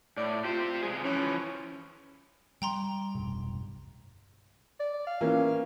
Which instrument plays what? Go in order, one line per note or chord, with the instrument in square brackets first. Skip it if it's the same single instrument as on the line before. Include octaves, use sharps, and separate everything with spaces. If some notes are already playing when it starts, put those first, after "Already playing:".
[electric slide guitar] A2 [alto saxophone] D5
[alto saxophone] F4 [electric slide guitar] G4 C5
[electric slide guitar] C3 G#3 G#4
[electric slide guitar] E3 F3 [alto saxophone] C#4
[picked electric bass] G3 [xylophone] G5 A#5 C6
[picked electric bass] F1 B1 G2
[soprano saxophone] D5
F5
[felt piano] E3 A#3 C#4